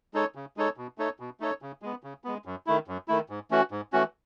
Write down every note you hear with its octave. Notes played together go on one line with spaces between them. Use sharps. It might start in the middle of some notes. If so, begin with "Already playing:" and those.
G#3 D#4 A4 C#5
C#3
G#3 D#4 A4 C#5
B2
A3 D#4 A4 C#5
B2
A3 D#4 A4 C#5
C#3
G#3 B3
C#3
G#3 B3
F#2
D#3 A3 E4
F#2
D#3 A3 E4
G#2
E3 A3 C#4 F#4
G#2
E3 A3 C#4 F#4